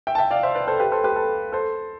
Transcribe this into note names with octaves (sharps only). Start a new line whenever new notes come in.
E5 G5
A5
E5 G5
D5 F5
C5 E5
B4 D5
A4 C5
G4 B4
A4 C5
G4 B4
A4
A4 C5